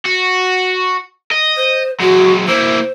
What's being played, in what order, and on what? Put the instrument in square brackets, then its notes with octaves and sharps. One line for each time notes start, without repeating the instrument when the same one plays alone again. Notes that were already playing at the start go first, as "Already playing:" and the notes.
[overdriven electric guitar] F#4
D#5
[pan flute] C5
[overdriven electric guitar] F#3 G#3 [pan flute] F#4
[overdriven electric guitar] A#3 E4 [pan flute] C5